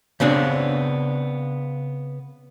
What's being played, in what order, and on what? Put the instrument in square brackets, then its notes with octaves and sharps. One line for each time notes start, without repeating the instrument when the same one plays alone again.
[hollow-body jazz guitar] C#3 B3 C4 D4